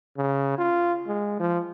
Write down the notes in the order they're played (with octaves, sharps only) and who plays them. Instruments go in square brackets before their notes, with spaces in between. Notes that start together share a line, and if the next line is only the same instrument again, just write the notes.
[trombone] C#3
F4
G#3
F3